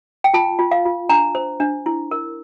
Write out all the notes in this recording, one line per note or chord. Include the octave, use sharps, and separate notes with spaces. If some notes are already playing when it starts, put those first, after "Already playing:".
G5
F4 A5
F4
F5
F4
D4 A#5
C5
D4
E4
A#4